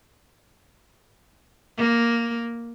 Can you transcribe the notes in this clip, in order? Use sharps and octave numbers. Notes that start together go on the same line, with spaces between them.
A#3